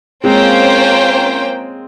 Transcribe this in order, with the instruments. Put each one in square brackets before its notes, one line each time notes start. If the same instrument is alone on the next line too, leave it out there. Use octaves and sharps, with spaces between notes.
[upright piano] G#3 C4 [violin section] A#3 C#4 F4 C5 G5